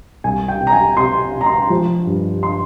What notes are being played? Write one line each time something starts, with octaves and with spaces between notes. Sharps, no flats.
C2 G#5
G5
C3
A#5
G#5
C3 C6
C3
A#5
C6
F3
G2
C6